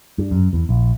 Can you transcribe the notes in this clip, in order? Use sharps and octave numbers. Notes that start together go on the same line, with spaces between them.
G2
F#2
E2
A#1